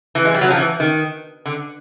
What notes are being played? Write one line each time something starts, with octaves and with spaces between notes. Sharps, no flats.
E3
G#3
G3
F#3
F3
E3
D#3
D3